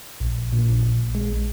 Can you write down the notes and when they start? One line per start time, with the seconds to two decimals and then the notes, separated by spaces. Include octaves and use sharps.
0.20 A#1
0.52 A#2
0.83 A#1
1.15 G#3